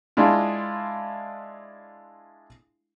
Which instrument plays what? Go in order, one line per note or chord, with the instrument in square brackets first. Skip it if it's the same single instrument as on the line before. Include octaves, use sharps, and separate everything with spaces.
[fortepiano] G#3 D4 E4 F4